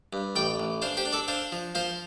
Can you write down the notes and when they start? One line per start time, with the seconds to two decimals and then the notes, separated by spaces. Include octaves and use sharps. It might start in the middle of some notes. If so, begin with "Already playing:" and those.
0.13 G2
0.36 A1 D5 G5
0.60 A1
0.82 D4 C5 F5
0.97 G4 C5
1.05 D4
1.13 A4 D5
1.28 D4 C5 F5
1.52 F3
1.75 F3 C5 F5